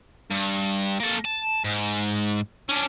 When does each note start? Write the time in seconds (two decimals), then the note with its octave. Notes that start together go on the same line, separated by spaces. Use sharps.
0.31 G2
1.00 A#3 A4
1.25 A5
1.65 G#2
2.69 C#4 D4